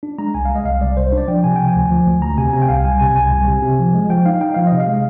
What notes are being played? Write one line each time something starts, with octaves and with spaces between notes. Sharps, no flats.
D4
G#3 A#5
C2 G#5
G#3 F5
D#5
C2 F5
C2 D5
C2 C5
C5
D4
D5
F3 G5
C3 G#5
F3 G5
G#5
D2
F3
D2
D2 A#5
C3 G#5
C3 G#5
G5
C2 F5
C2 G#5
C3 G#5
C2 G#5
C2 G#5
C3
C3
F3
G#3
F3 G5
D#4 F5
D#4 G5
F3 F5
D#5
C3
F5
G#3